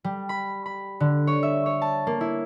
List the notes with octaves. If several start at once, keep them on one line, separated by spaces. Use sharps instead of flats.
G3
B5
B5
D3
C#5
E5
C#5
A5
A#3
E4